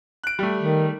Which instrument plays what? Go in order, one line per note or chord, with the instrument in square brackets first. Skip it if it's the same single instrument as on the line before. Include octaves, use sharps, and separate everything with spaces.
[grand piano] F#6 D7
G3 A3
[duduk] D#3